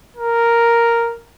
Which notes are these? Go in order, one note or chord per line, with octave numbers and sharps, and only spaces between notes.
A#4